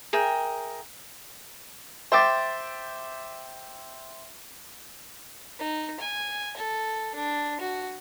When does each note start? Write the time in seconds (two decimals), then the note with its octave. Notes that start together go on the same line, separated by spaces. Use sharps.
0.13 G#4 A#4 E5 G5
2.12 C5 E5 G5 D6 A6
5.59 D#4
6.00 G#5
6.57 A4
7.15 D4
7.60 F#4